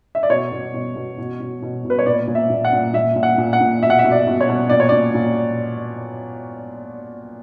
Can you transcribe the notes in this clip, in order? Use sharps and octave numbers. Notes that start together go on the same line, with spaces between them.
E5
D5
B2 C#5
B2
B2
B2
B2
B2
B2
B2
B4
C#5
A#2 D5
A#2
E5
A#2
F#5
A#2
A#2 E5
A#2
F#5
A#2
F#5
A#2
B2 E5
F#5
E5
B2
D5
B2
C#5
B2
A#2 D5
C#5
A#2 D5
A#2